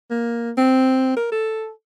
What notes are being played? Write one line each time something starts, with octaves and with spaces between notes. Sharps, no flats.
A#3
C4
A#4
A4